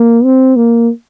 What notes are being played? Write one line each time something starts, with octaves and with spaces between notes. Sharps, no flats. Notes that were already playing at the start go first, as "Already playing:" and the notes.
Already playing: A#3
C4
A#3